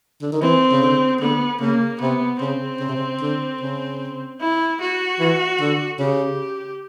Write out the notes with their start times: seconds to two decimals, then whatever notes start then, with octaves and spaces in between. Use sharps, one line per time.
0.22 D3
0.32 D#3
0.42 E3 C4
0.72 C#3
0.82 D3
1.21 D3 B3
1.61 C#3 A#3
2.01 C3 B3
2.41 C#3 C4
2.80 C#3
2.88 C3
2.97 C#3
3.21 D3
3.61 C#3
4.40 E4
4.80 F#4
5.20 E3
5.61 D3
5.99 C#3 G4